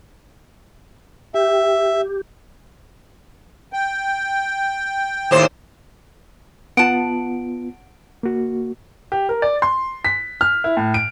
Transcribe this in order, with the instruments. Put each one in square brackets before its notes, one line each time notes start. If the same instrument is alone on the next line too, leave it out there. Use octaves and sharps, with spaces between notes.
[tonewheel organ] G4 [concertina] E5
[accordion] G5
[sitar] D#2 A2 C5
[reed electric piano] B3 F4 [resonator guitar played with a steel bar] F#5 A5 [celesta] D7
[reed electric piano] A#3 F#4
[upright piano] G4
A#4
D5
C6
B6
F6
E4
A2
D7